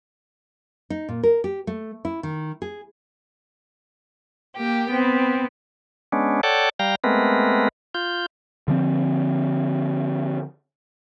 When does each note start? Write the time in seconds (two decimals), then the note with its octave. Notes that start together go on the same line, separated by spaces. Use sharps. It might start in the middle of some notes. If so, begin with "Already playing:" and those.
0.90 D#4
1.09 A#2
1.23 A#4
1.44 G4
1.67 A3
2.05 E4
2.23 D#3
2.62 G#4
4.55 A#3 G4 G5
4.91 B3 C4
6.12 G#3 B3 C#4 D4
6.43 A4 C#5 D5 F#5 G5 A5
6.80 G3 F5 G5 A#5
7.04 G#3 A3 B3 C4 A#4 B4
7.95 F4 G6
8.68 D3 F3 C4